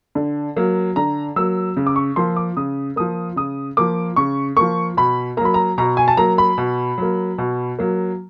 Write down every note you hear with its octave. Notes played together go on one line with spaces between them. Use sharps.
D3
F#3 A#3
D3 A#5
F#3 A#3 E6
C#3
D6
C#6
F3 A#3 C6
D6
C#3 D#6
F3 A#3 D#6
C#3 D#6
F3 A#3 D6
C#3 C#6
F3 A#3 C#6
B2 B5
F#3 A#3 A#5 B5
A#5
B2 A#5
G#5
A5
F#3 A#3 A#5
B5
B2
F#3 A#3
B2
F#3 A#3